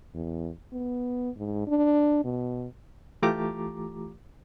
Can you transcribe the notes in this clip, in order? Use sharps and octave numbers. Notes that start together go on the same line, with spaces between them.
E2
B3
G#2
D4
B2
E3 A3 F4 G4 A#5 D6